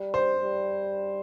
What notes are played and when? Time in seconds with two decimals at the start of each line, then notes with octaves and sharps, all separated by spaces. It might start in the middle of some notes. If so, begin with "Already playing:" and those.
Already playing: G3
0.14 C5
0.41 G3